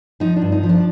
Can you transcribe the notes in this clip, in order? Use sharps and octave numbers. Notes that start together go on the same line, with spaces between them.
F3 D#4
D4
G2
D#4
F3
D4